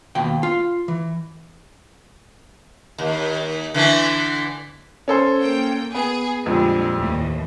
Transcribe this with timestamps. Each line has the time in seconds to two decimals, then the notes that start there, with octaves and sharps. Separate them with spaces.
0.15 D#2 B2 G5
0.43 F4
0.88 E3
2.98 D#2
3.74 D3 E3 A3
5.08 C#4 A4 C5
5.41 A#3 G5
5.95 B3 G#4
6.46 F2 A#2 D3 G3 G#3
6.97 D#2 A2 E3